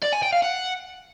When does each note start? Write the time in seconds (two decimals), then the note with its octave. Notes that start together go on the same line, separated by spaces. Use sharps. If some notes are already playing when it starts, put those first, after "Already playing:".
0.02 D5
0.12 G#5
0.23 G5
0.33 F5
0.43 F#5